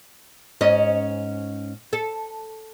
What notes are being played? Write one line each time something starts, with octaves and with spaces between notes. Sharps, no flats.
G#2 C#4 D#5
A4